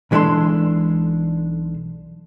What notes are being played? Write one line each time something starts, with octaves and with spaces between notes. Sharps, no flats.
B1 E3 G#3 D4 A4 C6